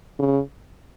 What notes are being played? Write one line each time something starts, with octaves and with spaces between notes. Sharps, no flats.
C#3